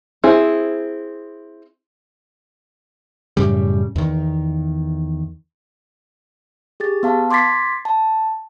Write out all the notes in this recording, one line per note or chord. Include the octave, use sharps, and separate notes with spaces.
C4 E4 G#4
F#2 A2 C#3 G3
E2 D#3
G4 G#4 A6
B3 F5 A5
C6 D6 G#6 A6 B6 C7
A5